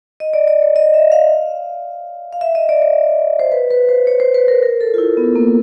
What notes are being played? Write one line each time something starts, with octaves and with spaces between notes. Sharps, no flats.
D#5
D5
D5
C#5
D#5
E5
F5
F5
E5
D#5
D5
C#5
C5
B4
B4
C5
C#5
C5
B4
A#4
A#4
A4
F4
E4
B3
A#3